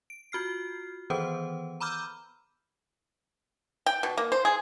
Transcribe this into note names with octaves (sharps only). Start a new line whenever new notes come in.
D7
F4 F#4 F6 C7
D#3 E3 B3 B4 C5 D#6
A#5 B5 D6 E6 F6 G6
G5
B2
A#3
C5
G#4